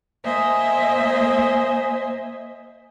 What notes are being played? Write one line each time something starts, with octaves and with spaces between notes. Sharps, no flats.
A#3 C5 D#5 E5 G#5